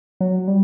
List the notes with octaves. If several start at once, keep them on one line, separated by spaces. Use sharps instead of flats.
F#3
G3